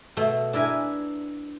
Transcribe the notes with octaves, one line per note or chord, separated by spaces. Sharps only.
B2 A3
D4 E4 A#4 B4 G#5